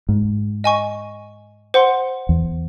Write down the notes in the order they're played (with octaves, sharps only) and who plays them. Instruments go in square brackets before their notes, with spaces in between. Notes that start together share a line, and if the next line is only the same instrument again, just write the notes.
[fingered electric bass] G#2
[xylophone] D#5 G#5 C#6
C5 F#5 C6
[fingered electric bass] E2